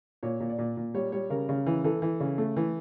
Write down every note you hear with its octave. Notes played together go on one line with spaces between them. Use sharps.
A#2 C#5
A#2
D5
A#2
A#2
G3 C#5
G3 C#5
C#3 A#4
C#3
E3
E3 A4
E3
C#3
A3
E3